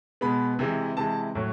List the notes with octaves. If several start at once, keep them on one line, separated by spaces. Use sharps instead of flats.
B2 G#3 B3 B5
C3 E3 G#3
C3 E3 G#3 A5
A2 F#3